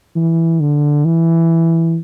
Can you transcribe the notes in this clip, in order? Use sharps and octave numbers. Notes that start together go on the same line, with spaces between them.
E3
D3
E3